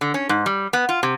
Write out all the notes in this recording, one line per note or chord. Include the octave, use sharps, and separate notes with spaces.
D3
C#4
G#2
G3
B3
F4
C3